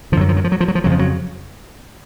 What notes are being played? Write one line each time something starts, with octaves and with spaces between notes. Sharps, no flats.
F#2 D3 F3 F#3
F3
F#3
F3
F#3
F3
F#3
F3
F2 C#3 F#3
F3
F#3